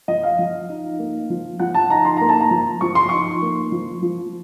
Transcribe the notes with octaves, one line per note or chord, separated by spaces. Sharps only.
F3 D#5
F5
F3
D#4
A#3
F3
F3 F#5
A5
D#4 A#5
C6
A#3 A#5
A5
A#5
F3
F3 C#6
C6
D#4 C#6
A#3
F3
F3